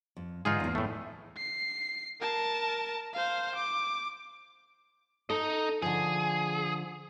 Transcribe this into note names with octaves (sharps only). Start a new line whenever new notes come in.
F2
G#2 D3 E3 D#4 F4 G#4
E2 A#3
A2 A3
C7
A#4 A5
C5 F5
D6
D#4 A4 D#5
D3 F3 G#4